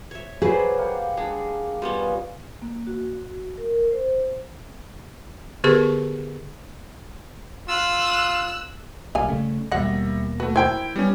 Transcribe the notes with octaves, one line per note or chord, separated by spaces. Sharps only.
C#5 E5
F#3 G#4 B4 C5 D5 B5
A#3 G4 F#5
G#3 D4
G3 B3 C#4 F4
A#3
F#4
A#4
C5
D3 B3 G4 G#4 A#4 C#6
F4 E6 F#6
B1 G3 A#3 F5 G#5
C#3 A3
D#2 B2 F#3 G3 A#3 E5 F#5 A#6
A3 F#4 B4
D#3 E4 C5 G5 G#6
G3 B3 C#4